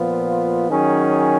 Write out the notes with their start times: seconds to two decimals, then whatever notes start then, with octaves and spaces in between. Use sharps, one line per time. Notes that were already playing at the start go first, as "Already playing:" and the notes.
Already playing: A#2 F3 B3 F4
0.69 D#3 F#3 C#4 G#4